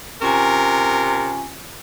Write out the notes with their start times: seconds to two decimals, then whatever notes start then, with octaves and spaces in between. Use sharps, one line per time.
0.22 C3 C#4 F4 A#4 G#5